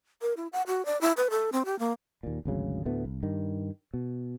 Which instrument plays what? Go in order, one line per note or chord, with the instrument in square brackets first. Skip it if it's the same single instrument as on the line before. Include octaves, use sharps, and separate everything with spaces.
[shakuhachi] A#4
E4
F#5
F#4
D5
E4
B4
A4
C4
G4
A#3
[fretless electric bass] D#2 A#2
G#1 D2 C#3 F#3
D2 A2 A3 B3
C2
G2 D#3
B2